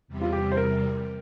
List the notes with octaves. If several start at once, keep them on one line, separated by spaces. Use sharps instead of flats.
E2 C3 G3
F4
G4
C5
A#4